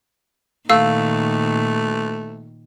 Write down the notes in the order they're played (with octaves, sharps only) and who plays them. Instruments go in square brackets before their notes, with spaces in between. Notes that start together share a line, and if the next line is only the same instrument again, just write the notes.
[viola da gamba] A#2 D#3 [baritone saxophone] A3 [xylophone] F5 E6